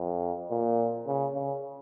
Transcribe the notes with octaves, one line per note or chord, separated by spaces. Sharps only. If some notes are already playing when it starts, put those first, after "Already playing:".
Already playing: F2
A#2
C#3
C#3